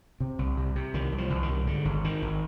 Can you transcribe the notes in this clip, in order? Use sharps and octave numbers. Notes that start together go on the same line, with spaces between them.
C3
C2
C3
C3
C2 D#3
C2
F3
C2
D#3
C3
G#2 D3
G#1
G#2 D#3
G#1